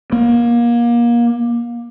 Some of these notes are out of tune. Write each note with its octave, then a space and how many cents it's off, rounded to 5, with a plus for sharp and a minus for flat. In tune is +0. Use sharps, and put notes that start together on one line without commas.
A#3 +25